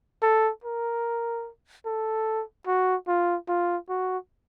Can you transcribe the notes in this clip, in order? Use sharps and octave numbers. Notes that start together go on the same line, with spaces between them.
A4
A#4
A4
F#4
F4
F4
F#4